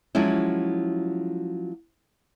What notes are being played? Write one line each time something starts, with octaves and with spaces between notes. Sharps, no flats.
F3 F#3 G#3 C#4 E4